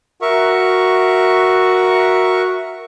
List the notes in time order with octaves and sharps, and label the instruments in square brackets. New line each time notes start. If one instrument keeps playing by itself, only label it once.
[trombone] F#4 [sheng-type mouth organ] A#4 E5 C#6